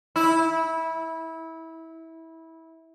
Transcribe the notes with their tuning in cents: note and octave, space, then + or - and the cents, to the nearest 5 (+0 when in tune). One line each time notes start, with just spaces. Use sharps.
E4 -20